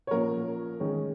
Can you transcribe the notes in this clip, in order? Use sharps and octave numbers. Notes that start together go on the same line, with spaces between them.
C#5
A#2 F3 A#3 C#4 A#4
D#3 G#3 C#4